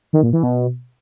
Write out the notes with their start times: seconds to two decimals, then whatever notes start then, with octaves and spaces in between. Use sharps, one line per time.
0.13 D#3
0.23 A#2
0.33 E3
0.43 B2